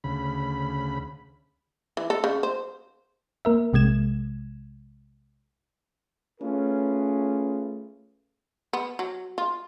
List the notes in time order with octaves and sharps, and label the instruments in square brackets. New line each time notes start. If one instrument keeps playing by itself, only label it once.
[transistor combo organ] D2 C#3 B5
[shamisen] E3
A4
C#3
C5
[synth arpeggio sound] A#3 A#4 E5
B1 C3 G#3 G#6 E7
[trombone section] A3 C#4 F4 G#4 B4
[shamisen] B3
F#3
F4